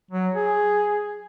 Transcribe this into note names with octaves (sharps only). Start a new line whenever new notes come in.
F#3
G#4